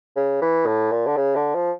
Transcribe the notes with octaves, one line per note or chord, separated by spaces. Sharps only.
C#3
E3
A2
A#2
D3
C#3
D3
F3